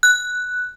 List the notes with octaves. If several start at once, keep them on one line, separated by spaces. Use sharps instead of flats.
F#6